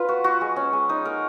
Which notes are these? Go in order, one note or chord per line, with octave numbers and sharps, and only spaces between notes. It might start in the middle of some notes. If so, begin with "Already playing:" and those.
Already playing: F4 B4
F#4
F#4
G#3
C#4
G#3
D#4
A#4